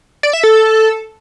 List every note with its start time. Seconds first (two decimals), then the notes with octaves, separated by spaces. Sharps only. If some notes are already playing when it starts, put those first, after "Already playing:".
0.23 D5
0.33 E5
0.43 A4